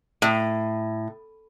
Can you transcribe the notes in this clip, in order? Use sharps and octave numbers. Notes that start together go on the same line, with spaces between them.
A2